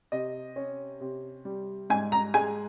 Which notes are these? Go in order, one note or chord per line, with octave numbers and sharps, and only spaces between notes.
C3 D#5
C#4
C3
G3
G#2 G#5
A#5
G#3 G#5